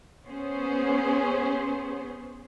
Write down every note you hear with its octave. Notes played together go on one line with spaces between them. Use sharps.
B3 C#4 G#4 C5